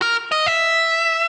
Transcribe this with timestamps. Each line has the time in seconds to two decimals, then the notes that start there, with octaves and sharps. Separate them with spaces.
0.02 A#4
0.32 D#5
0.46 E5